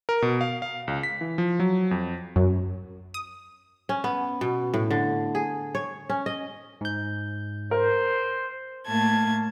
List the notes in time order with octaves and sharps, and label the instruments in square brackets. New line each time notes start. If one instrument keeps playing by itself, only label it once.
[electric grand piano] A#4
B2
F5
F5
C#2
B6
E3
F3
F#3
F2
[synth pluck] F#2
D#6
[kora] C#4
B3
B2
A2
D3
G#4
C#5
C#4
D#5
[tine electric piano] G#2 G6
[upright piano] A#4 [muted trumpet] C5
[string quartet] A2 A3 A#3 A5 G#6